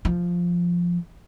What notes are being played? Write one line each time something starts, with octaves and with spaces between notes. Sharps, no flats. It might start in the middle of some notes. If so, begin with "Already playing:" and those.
F3